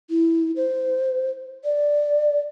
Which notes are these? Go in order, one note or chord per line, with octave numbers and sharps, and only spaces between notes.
E4
C5
D5